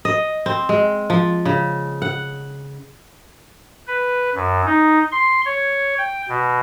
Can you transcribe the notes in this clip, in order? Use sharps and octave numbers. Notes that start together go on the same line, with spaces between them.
D#5
C4
G#3
F3
C#3
F#5
B4
F#2
D#4
C6
C#5
G5
B2